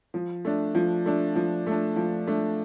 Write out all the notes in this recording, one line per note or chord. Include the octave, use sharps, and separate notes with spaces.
F3
A3 D4
F3
A3 D4
F3
A3 D4
F3
A3 D4